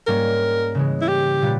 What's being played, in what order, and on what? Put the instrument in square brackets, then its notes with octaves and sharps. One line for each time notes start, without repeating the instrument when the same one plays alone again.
[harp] G#2 G3 A#3 C#4 [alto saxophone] A#4
[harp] C#3 E3 G#3
[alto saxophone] E4
G4
[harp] A#2 G3 B3